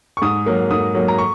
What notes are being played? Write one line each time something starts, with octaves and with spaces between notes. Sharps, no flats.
C#6
G#2 D#6
F#3 A#3
G#2 D#6
F#3 A#3
A#5
C#6